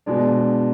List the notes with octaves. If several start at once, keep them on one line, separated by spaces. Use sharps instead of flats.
B2 G#3 D4